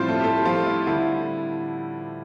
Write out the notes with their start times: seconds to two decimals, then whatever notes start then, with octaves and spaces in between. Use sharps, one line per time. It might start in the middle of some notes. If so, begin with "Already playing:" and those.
Already playing: A2 F3 G3 C4 E4 F4 C5
0.08 A3 A4
0.20 G4
0.24 A3 A4
0.45 F3 F4
0.66 E4
0.87 D3 G3 E4